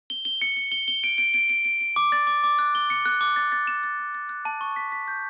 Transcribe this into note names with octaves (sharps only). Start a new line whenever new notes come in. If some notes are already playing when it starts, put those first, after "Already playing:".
G7
G7
C#7
C#7
G7
G7
D7
D7
D7
D7
D7
D7
D6
A6
D6
D6
F#6
G7
C#7
F#6
D6
A6
A6
E7
A6
A6
A6
F#6
A5
C#6
B6
B6
G6